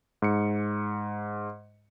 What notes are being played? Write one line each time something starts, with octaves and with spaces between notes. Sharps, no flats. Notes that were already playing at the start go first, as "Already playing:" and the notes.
G#2 C#7